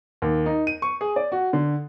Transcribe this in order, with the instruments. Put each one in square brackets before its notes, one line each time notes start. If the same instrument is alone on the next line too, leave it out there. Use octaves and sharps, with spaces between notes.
[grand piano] D#2
D#4
D#7
C#6
G#4
D5
F#4
D3